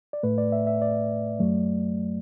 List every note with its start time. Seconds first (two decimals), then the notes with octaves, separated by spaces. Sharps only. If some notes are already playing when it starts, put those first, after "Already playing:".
0.13 D5
0.23 A2 A3 B4
0.38 D5
0.52 E5
0.67 E5
0.82 D5
1.39 F#2 F#3 A3